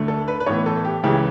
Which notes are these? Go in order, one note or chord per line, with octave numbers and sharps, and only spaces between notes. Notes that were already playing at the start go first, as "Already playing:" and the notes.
Already playing: D2 D3 A3
A4
B4
B4
A2 E3 B3 C#5
A4
G4
C#2 C#3 E3 G4